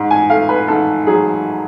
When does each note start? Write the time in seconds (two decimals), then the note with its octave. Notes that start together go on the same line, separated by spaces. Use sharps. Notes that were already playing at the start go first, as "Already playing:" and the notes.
Already playing: G#2
0.11 G#5
0.30 A3 F5
0.49 B4
0.68 G#2 A4
1.07 F#3 G#4